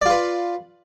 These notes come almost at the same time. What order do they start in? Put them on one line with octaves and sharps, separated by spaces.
D5 F4 B4